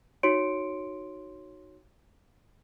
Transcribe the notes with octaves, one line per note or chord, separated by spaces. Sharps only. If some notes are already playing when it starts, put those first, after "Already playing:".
D#4 F#4 C#5 C6 C#7 D7